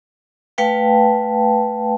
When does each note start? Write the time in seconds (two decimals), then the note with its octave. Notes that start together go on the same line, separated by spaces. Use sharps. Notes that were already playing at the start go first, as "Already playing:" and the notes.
0.58 A3 B4 F5 G5 A5